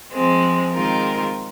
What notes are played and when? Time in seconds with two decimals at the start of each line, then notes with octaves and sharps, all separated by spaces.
0.12 F3 G#3 C4
0.72 D#3 G#3 C4 F4 A#4